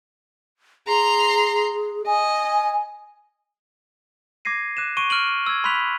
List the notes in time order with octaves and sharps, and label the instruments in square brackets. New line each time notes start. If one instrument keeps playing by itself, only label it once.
[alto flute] G#4 [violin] A#5 C6
[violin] D#5 [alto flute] G#5
[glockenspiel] D6 G#6 A#6 C7 D#7
D6 F#6 D#7 E7
C#6 D7 D#7 G7
C#6 F6 D7 D#7 F#7
E6 G#6
B5 C6 F#6 B6 F7